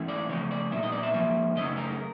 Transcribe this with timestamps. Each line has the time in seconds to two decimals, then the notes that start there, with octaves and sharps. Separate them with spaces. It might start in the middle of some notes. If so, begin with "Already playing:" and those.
Already playing: G#2 E3 A3 C#4
0.08 D5
0.29 C#3 F3 A3 C#5
0.51 D5
0.71 C2 A#2 F#3 B3 E5
0.83 D#5
0.92 D5
1.03 E5
1.14 G#2 F3 A#3 E5
1.55 F#2 C#3 A3 C#4 D#5
1.77 A#4